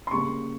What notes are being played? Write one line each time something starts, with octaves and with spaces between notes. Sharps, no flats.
C6
C#3 G3 A#3 C#6